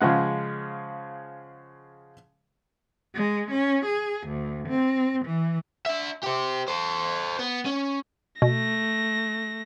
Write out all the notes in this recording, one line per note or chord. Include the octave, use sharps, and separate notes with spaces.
C#3 F3 G#3 F#5
G#3
C#4
G#4
D2
C4
E3
D4 E5
G4 C5
A4 C5
B3
C#4
B2 A3 A#6